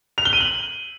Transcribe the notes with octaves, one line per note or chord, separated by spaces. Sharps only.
F7
G7
D#7
F#7